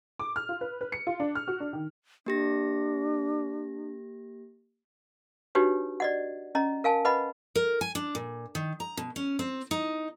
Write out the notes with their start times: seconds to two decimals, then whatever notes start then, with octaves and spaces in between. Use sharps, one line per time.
0.19 D6
0.36 F6
0.49 F4
0.61 B4
0.81 B4
0.92 C#7
1.07 F4
1.20 D4
1.35 F6
1.48 F#4
1.60 D4
1.73 D#3
2.26 A#3 D4 G4 A#6
5.55 D4 D#4 F#4 G4 B4 C#5
6.00 D5 D#5 F#5
6.55 C#4 D#5 A#5
6.84 A#4 F5 G#5 A5
7.05 B4 D#5 F#5 B5
7.56 A#4
7.81 G#5
7.95 D4
8.15 A#2
8.55 D#3
8.80 A#5
8.97 B2
9.16 C#4
9.39 C4
9.71 D#4